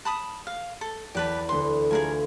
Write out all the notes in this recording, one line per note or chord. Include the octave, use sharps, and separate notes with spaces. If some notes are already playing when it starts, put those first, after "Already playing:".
A5 B5 D#6
F5 F6
A4
E2 G4 B4 A5
D2 B4 C6
A3 F4 G#4 A#4 G#5